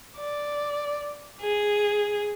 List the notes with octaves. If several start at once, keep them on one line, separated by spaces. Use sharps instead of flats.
D5
G#4